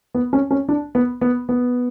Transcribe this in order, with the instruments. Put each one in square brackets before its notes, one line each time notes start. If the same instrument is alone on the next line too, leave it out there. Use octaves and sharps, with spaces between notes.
[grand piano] B3
C#4
C#4
D4
B3
B3
B3